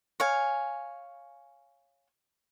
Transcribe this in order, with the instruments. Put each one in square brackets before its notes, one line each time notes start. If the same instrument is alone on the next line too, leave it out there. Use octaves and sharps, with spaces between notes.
[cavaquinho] C#5 F5 G#5